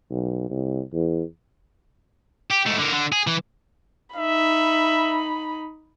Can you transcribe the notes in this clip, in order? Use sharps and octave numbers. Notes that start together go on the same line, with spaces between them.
B1
C2
E2
G4
G#2 A3
D3 A#4
D3
G#4
E3
D#4 E5 B5